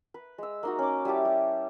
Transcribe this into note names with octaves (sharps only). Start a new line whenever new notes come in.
B4
G#3 E6
A#3 D#4 F#4
C#4 D6
G3 E4 G4 A5
G3